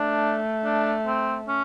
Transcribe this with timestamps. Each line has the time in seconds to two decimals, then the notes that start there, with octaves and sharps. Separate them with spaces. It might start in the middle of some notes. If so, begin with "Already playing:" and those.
Already playing: A3 D4
0.65 D4
1.07 C4
1.48 C#4